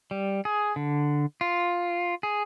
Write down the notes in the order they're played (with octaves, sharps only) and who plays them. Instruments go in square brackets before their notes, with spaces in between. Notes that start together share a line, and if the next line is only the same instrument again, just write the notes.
[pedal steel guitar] G3
G#4
D3
F4
G#4